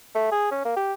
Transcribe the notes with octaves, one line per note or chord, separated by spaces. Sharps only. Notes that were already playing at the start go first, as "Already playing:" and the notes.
A3
G#4
C#4
A#3
G4